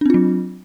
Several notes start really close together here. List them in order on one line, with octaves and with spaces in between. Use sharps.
D4 C4 F4 F#3